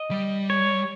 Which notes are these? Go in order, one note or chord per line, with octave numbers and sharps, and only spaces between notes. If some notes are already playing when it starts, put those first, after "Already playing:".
Already playing: D#5
G3
C#5